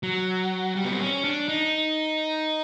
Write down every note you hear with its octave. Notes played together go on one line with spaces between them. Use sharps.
F#3
G3
B3
C4
C#4
D4
D#4